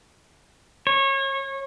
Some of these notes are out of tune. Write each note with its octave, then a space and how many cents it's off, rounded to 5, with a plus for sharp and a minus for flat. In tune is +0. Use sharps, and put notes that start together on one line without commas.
C#5 -30